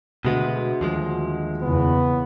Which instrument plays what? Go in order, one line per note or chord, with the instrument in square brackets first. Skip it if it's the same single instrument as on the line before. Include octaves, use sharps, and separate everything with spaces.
[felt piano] D2 [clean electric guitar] B2 G#3 B3
[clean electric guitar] D#2 F3 G#3
[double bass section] E2 C#3 [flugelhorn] B3